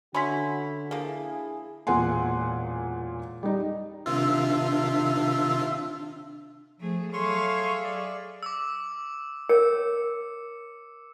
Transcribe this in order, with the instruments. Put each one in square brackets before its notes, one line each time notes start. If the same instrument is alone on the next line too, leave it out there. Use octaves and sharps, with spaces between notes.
[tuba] D3 [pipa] C#4 E4 [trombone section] F#4 [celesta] B5 C6 B6
[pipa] F3 A#3 [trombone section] E4 G#4
[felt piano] E1 A#2 G#4 F#5 G#5 C6
G3 D#4
[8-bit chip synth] C3 D#3 F4 [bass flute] D4 [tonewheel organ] E5
[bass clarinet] F3 [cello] A3 G#4
[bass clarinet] F#3 [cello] G#4 E5 [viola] A4 F5 [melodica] C#5 C6 C#6
[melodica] D5
[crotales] D6 E6
[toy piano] A#4 C#5 [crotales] C#7